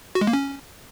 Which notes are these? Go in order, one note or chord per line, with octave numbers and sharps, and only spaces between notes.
F#4
G#3
A#3
C#4